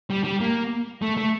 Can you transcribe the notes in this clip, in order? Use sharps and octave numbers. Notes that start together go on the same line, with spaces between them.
G3
G3
A#3
A3
A3